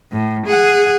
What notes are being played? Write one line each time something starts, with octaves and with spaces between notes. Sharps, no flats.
A2
G#4 F#5